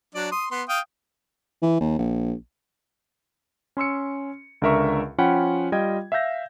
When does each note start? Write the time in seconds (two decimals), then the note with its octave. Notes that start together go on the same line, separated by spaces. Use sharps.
0.15 F#3 D4 D5
0.32 C6 D#6
0.51 B3 C6
0.69 F5 G5 D#6
1.62 E3
1.80 D#2
1.99 A#1
3.77 C#4 C6 E6 C#7
4.62 C#2 D3 A#4 E5 C#6
5.18 F3 C#4 F4 F#5 G5 B5
5.72 G3 F4 D#5 G5 G#6
6.12 E5 F5 E6 G6 A#6